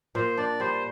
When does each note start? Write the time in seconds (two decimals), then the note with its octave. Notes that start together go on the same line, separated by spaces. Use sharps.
0.15 A#2 C5
0.38 D4 D5
0.60 G3 C5